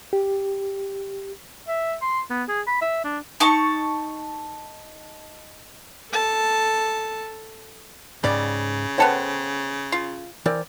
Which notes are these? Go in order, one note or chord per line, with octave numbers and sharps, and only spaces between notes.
G4
E5
C6
B3
G#4
B5
E5
D4
D#4 A5 C#6
A4 A5
C#2 G#2 C#3 G3 D5
B3 A4 C5 C#5 F#5 G5
F4
E3 C4 A#4 D5